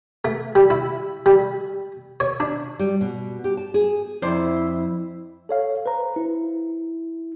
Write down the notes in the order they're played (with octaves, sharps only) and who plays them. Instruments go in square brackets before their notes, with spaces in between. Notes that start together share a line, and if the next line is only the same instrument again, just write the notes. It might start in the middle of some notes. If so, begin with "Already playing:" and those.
[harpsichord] A3
G3
E4
G3
C#5
D4
[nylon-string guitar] G3
B2
G4
A5
G#4
[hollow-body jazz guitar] F2 C5 D5 [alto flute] E4
[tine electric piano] A4 C#5 F5
B4 C5 A#5
E4